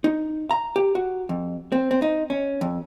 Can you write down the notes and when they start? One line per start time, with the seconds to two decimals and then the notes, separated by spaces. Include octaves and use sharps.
0.04 D#4
0.51 A#5
0.76 G4
0.95 F#4
1.29 F2
1.72 C4
1.91 C4
2.02 D#4
2.30 C#4
2.61 F2